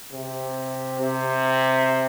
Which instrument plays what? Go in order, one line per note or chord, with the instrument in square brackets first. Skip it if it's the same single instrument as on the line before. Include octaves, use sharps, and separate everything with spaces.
[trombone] C3
C3